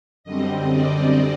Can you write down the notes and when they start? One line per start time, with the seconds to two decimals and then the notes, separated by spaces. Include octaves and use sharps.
0.24 F#2 D3 G3 C4 D#5
0.70 D5